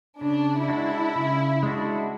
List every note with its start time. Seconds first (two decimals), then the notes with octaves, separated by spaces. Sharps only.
0.21 C#3 D4
0.68 G#3 D4 E4 F#4
1.16 C#3
1.63 G#3 D4 F#4